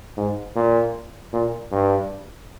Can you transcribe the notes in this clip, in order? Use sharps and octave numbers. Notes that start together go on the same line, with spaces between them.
G#2
A#2
A#2
G2